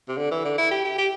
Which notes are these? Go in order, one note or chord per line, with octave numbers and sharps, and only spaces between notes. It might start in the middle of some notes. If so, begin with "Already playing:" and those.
C3
D3
E3
D3
E4
G4
G4
G4